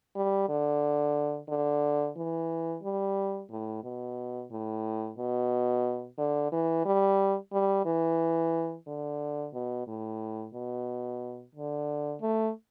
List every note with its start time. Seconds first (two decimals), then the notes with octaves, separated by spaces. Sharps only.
0.16 G3
0.49 D3
1.49 D3
2.17 E3
2.83 G3
3.51 A2
3.84 B2
4.51 A2
5.18 B2
6.18 D3
6.52 E3
6.85 G3
7.53 G3
7.85 E3
8.87 D3
9.53 B2
9.87 A2
10.54 B2
11.55 D3
12.21 A3